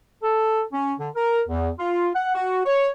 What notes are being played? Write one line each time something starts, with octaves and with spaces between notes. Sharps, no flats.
A4
C#4
D3
A#4
E2
F4
F#5
F#4
C#5